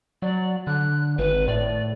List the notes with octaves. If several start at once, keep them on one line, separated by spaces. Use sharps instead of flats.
F#3 D5
D3 F#6
G#1 B4
A2 D5